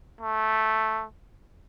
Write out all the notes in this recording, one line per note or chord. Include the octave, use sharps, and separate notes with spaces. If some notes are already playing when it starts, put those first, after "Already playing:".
A3